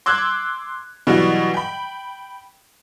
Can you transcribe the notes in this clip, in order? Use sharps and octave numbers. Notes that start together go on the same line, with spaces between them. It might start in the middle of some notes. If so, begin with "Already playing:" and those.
C6 D6 E6 F#6 G#6
B2 E3 F#3 G3
G5 B5